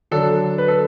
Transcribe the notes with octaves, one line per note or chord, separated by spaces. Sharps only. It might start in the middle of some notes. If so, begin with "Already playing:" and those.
D3 F#3 D4 A4
B4
A4